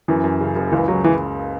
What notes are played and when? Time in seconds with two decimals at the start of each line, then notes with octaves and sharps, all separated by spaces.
0.08 F#2 E3
0.24 F#2
0.41 C#3
0.56 F#1
0.72 C#2 E3
0.88 C#3 F#3
1.04 E3